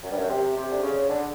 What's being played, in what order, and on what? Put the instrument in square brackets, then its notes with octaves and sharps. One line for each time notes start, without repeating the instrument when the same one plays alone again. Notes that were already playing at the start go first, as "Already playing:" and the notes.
[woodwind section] F#2
G2
F#2
C3
C3
D3
C#3
D3